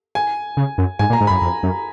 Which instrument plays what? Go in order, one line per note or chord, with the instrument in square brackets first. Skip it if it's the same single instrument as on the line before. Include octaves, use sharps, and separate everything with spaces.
[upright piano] G#5
[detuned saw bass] C#3
F#2
[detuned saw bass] G#2 [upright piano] G#5
[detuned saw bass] A#2
[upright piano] A#5
[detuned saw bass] G#2
[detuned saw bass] F#2 [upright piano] B5
[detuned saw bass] F2
F#2